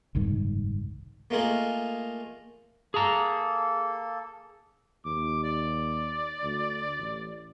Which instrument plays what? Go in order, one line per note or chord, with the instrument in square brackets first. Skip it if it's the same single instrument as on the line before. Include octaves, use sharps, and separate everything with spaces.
[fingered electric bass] F#1 C2 G#2 D#3
[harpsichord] A3 A#3 D#4 F4 G#4 A#4
[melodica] A#3 A4 [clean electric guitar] G#4 A#5
[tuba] D#2 [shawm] D6
[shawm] D5
[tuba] D2
A1